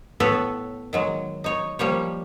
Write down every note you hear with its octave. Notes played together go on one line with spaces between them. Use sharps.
A2 B3 A4 B4 C#5
D#3 F#3 G#3
D#4 C#5
F3 G3 A#3 C#5